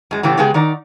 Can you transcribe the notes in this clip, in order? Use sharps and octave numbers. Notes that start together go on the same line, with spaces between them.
F#2 G#3
A2 C#3 E3 B3 D4 G4
C#3 G#3 B3 G4 G#4
D#3 D#4 D5